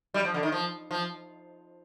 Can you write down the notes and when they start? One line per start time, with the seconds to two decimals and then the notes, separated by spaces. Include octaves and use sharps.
0.14 G3
0.25 F3
0.34 D3
0.43 D#3
0.52 F3
0.91 F3